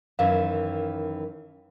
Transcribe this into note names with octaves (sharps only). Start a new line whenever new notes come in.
F#2 D#3 E3 F5